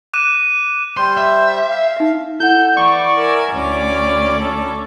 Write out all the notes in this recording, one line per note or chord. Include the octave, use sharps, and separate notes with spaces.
D6 F#6 D#7 E7
G3 C5 C6
E5
F5
D#4 E5
E4 A4 F#5 G6
E3 D5 C#6
A#4 E5 G#5
D2 C#4 D5 D6
A4